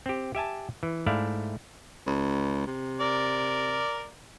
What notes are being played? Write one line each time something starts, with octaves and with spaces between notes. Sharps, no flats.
C4 G4
G4 E5 G#5 A5
E3
G#2 A3 E4 D5 F5
C#2
C3
A#4 D5